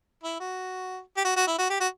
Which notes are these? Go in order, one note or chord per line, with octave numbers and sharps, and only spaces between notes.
E4
F#4
G4
F#4
F#4
E4
F#4
G4
F#4